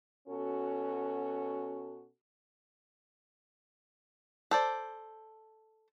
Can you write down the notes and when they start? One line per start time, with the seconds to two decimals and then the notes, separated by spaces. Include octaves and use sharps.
0.28 B2 C#4 F#4 A4
4.51 A4 C5 D5